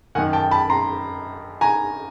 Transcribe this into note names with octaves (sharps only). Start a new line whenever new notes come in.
F#2 D#3 F#5 G#5
G5 A5
A5 B5
A#5 C6
G#5 A#5